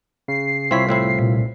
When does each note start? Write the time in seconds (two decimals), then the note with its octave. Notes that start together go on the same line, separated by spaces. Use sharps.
0.28 C#3 C7
0.71 C2 C4 E4 F4 C#5 B6
0.89 A2 C4 E4
1.19 A#2